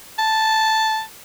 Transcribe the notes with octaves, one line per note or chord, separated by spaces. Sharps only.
A5